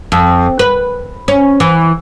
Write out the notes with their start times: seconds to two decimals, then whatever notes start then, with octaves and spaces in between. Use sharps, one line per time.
0.12 F2
0.59 B4
1.28 C#4
1.60 E3